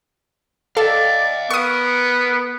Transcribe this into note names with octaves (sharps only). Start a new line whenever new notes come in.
A4 D5 D#5 F5
B3 A#4 C#6 D#6